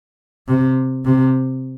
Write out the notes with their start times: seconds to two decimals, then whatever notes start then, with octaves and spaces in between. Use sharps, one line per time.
0.47 C3
1.05 C3